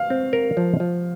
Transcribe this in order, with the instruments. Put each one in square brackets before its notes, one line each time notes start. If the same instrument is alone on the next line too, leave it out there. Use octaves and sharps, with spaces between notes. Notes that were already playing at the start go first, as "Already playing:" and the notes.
Already playing: [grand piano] F5
[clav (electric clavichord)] C4
A#4
F3
F3